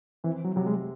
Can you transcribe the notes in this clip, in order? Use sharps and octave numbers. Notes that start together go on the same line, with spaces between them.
E3 C4
F#3
C3 F#3
G#3